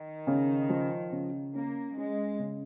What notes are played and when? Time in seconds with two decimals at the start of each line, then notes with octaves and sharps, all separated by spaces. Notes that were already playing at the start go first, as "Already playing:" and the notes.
Already playing: D#3
0.27 C#3
0.69 F3
1.12 C#3
1.55 A#3 C#4
1.97 G#3 C#4
2.39 C#3